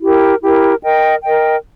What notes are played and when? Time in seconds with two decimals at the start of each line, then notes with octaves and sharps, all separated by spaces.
0.01 E4 G4 A#4
0.42 E4 G4 A#4
0.82 A#4 D#5 G5
1.23 A#4 D#5 G5